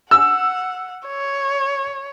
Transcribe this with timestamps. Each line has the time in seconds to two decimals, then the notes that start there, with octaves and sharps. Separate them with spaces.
0.11 F#5 E6
1.08 C#5